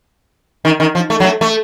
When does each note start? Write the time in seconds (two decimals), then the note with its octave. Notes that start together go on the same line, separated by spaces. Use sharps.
0.65 D#3
0.80 D#3
0.95 F3
1.10 A3
1.20 F#3
1.25 A3
1.41 A3